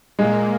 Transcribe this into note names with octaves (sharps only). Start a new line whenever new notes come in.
A#2 G#3 A#3